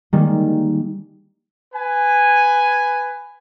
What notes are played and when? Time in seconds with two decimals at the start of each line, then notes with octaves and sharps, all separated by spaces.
0.13 D#3 G3 G#3 A#3
1.74 B4 G#5